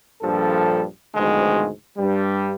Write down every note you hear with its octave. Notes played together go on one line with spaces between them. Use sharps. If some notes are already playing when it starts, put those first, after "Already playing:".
A#1 G2 F3 G3 A4
D2 G#2 B2 D#3 F3 G#3
G2 G3